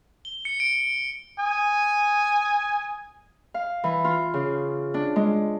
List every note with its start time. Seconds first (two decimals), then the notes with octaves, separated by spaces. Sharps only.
0.25 G7
0.45 C#7
0.60 D7
1.39 G#5 D#6
3.54 F5
3.84 E3
4.04 F4
4.34 C#3
4.94 D4
5.16 G#3